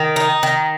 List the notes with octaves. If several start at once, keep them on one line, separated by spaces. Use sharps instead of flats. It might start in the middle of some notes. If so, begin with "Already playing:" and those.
Already playing: D#3
D#4
D#3